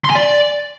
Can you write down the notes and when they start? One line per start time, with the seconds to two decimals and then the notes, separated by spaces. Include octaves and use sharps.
0.05 C6
0.10 G#5
0.16 D5